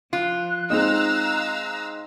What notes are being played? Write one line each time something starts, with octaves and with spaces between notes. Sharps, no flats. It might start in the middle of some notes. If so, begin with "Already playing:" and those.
F3 F4 F#6
G#3 C4 D#4 F5 A#5 E6